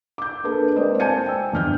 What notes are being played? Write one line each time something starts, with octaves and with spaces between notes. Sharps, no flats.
D6 G6
A#3 D4 G#4 A4 B4
G#3 A#3 C4 C5 D5 D#5
G#5 A5 G6 G#6 C#7 D#7
G5 E6
G1 E2 F6 G6